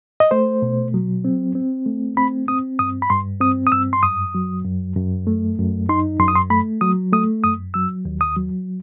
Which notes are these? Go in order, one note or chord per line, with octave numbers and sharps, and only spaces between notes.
D#5
A3 C5
B2
F#3
C4
C4
A3
C4 B5
C4 D#6
G2 D#6
B5
G2 C6
C4 D#6
D#6
G2 E6
C6
F#2 D#6
F#3
F#2
F#2
A3
F#2
D#4 C6
F#2 C6
D#6
C6
A3 B5
F#3 D#6
A3 D#6
F#2 D#6
F#3 E6
D#2
D#6
F#3